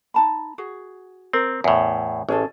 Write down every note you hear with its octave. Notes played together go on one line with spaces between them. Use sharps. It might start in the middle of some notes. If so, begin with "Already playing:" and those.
D#4 A5 B5
F#4 G#4
C4 A#4
E2 A2
A1 C#4 G#4 A4